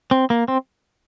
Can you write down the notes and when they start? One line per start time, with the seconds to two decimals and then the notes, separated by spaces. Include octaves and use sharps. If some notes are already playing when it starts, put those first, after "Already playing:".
0.11 C4
0.30 A#3
0.48 C4